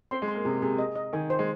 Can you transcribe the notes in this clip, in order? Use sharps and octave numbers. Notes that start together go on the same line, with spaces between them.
C4 C6
G#3
C6
A#3
C3 G#4
C3 G#4
D#5
D#5
D#3 G#5
C5
G#3